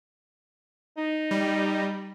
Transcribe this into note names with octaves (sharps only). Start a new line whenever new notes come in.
D#4
G3